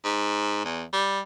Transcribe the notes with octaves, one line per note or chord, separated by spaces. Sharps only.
G#2
E2
G3